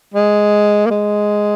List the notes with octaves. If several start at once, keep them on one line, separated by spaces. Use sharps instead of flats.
G#3
A#3
G#3